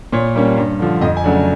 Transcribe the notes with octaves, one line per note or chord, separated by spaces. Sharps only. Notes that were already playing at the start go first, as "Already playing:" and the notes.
A#2 C#5
G3 A#3 C#4
G2
D3 F3
F2 D#5
G#5
C#3 F#3 A3 D4